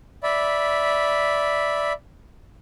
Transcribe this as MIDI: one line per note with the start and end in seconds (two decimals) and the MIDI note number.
0.23 1.93 74
0.23 1.93 76
0.23 1.93 83